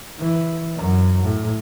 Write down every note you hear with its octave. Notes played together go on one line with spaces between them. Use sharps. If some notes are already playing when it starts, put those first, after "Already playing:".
E3
F#2 F#3
A2